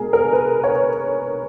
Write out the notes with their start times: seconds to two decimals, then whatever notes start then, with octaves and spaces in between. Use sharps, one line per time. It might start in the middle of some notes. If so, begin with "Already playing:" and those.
Already playing: B2 G#3 G#4 A#4
0.13 A#4
0.33 B4
0.64 C#5